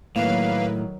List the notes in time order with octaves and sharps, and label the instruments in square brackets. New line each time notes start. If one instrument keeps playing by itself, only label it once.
[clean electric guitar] A2 [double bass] D#3 F#3 [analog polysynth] A#3 B4 [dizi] F5